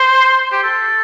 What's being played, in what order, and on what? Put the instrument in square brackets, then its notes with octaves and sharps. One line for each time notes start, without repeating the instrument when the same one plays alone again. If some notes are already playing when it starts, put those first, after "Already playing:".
Already playing: [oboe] C5
G4
A4